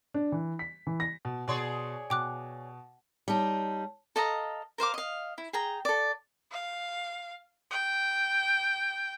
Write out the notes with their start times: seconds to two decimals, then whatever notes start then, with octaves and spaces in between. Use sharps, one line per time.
0.14 D4
0.32 E3
0.59 B6
0.87 E3
1.00 A#6
1.25 B2
1.48 B2 G#4 C#5 D5 C6
2.10 B2 G5 D6 F#6
3.28 G3 D#4 C#5 A5
4.16 A4 D#5 F5 A#5
4.78 A#4 C5 F5 D6
4.94 D#5 F5
5.38 E4
5.53 G#4 G5 A#5
5.85 A4 D5
6.51 F5
7.71 G5